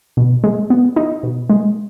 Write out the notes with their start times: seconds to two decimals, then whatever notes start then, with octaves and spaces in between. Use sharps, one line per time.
0.17 B2
0.44 G#3
0.70 B3
0.96 D#4
1.23 B2
1.50 G#3